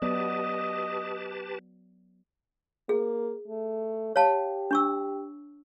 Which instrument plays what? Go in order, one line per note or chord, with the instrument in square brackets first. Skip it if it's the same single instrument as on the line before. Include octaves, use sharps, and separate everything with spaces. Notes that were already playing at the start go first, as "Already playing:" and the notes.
[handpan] F#3 B3 D5 [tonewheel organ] G4 B4 A5 [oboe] D#5
[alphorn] A#3 [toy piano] G#4
[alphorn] A3
[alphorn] G4 [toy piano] C#5 F5 A5
[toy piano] D4 C#6 E6